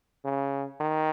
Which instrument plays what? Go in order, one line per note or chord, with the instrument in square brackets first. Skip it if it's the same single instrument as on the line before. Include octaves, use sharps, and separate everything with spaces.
[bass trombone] C#3
D#3